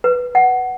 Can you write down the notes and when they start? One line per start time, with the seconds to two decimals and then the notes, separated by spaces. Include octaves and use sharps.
0.04 B4
0.35 F#5